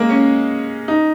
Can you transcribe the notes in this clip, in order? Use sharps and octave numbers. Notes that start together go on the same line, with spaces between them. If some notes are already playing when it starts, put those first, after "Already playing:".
Already playing: G#3 A#3
C#4
D#4